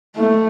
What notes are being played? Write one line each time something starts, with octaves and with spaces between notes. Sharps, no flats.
A3